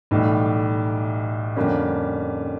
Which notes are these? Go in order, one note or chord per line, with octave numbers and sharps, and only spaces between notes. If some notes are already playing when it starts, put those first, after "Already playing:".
B1 A2 E3 G3
F2 D3 G3 A#3 C#4